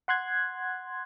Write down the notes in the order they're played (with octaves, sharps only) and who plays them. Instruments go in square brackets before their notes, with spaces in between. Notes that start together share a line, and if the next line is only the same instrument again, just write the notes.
[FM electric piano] F#5 C6 F#6 G#6